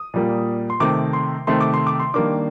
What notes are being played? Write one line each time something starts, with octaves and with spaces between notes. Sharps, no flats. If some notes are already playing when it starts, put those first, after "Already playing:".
Already playing: D#6
A#2 G3 A#3
C6
C3 D#3 A3 D6
C6
C3 D#3 A3 C6
D6
C6
D6
C6
D#3 G3 A#3 D4 D6